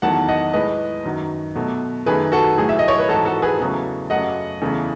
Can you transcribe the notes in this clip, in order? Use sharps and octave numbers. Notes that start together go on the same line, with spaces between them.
E2 D#3 F#3 A3 F#5 A5
D#5 F#5
A2 G#3 B4 D#5
F#2 D#3 F#3
B2 F#3 A3
F#2 D#3 A3 G#4 B4
F#4 A4
A2 F#3 A3 G#4
E5
D#5
C#5
B4
G#2 E3 G#3 F#4 A4
F#4 A4
G#4 B4
E2 C#3 F#3 A3
F#2 C#3 F#3 A3 D#5 F#5
E2 C#3 E3 A3